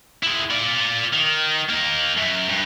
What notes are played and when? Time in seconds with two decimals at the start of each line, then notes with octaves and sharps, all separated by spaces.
0.23 G#3 E4
0.51 F4 D5
1.13 D#3
1.70 A#3 D#4
2.17 F#2
2.49 G2